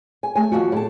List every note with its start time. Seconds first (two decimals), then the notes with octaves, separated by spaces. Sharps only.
0.23 G#5
0.35 A3 G#5
0.52 D#2 E3 F3 F#4
0.72 A2 A5